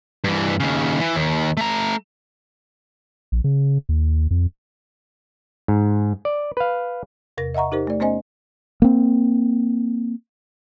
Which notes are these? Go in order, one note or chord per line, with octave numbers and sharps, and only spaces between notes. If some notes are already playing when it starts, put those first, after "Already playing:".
G2 E3
D#2 C#3
E3
D#2
A3 A#5
A#1
C#3
D#2
F2
G#2
D5
B4 F5
E2 C3 A#4 A#6
D#5 E5 F#5 A#5 C#6
D#4 G4 A#4 C5
A3 D5
A3 B3 C#4 C5 D#5 G#5
A#3 C4